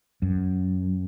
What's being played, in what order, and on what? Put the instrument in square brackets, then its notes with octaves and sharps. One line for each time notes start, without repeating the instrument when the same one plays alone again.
[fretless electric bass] F#2